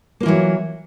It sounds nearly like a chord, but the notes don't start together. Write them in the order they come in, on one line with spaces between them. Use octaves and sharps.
A#3 F4 E3 F#3